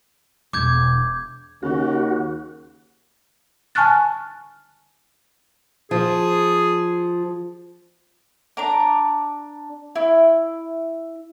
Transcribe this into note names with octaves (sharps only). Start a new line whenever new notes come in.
E1 D6 G6 G#6
D#2 C#3 F#4
G#5 A5 C#6 F6 F#6 A6
F3 G#4
D4 A#5 D6
E4